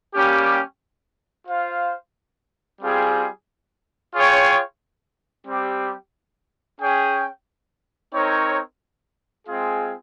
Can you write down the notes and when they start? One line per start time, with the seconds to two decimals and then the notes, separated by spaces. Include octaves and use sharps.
0.14 G3 A#3 C#4 G4
1.48 F4 C5 F5
2.81 G3 C4 F4 G#4
4.15 F4 G#4 C#5 G5
5.47 G3 C4 G4
6.80 C#4 G#4 C#5 G5
8.14 C4 D#4 A#4 C#5
9.47 G#3 C4 F4 G#4